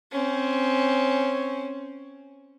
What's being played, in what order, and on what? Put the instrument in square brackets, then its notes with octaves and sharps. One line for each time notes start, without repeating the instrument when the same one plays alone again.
[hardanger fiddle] C4 C#4